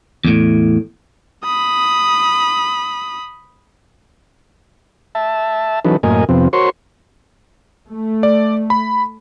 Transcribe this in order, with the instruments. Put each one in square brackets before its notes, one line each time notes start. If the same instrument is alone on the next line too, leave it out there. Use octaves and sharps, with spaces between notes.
[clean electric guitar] E2 A2
[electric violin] B5 D#6
[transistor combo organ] E5 A5
E3 F#3 C#4 D#4 A4 B4
F#2 A2 A#3 A#4 D#5 G#5
F2 C3 F3 B3 C4
F#4 A#4 C5 C#5 C6 C#6
[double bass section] A3
[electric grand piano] D5
B5